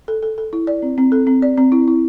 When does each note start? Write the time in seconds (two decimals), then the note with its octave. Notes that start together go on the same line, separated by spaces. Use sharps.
0.08 A4
0.23 A4
0.38 A4
0.53 E4
0.67 D5
0.82 C4
0.98 C4
1.12 A4
1.27 C4
1.42 D5
1.57 C4
1.72 E4
1.88 E4